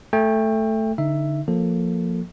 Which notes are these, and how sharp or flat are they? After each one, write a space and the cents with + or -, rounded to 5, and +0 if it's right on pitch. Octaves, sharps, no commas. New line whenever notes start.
A3 +0 G5 +25
D3 -20 D#4 +0 E5 +5
F3 +15 A#3 +0 A4 +0